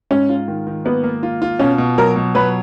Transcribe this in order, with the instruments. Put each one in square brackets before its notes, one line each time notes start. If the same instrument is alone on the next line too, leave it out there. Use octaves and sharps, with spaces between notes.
[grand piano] G#2 [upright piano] C#4
[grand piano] F4
D#3
D#3
[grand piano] A#3 [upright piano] B3
[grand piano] A#3
F4
F4
[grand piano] B2 [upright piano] C#4
[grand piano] B2
[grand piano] F#3 [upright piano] A#4
[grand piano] B2
[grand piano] F#3 [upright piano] B4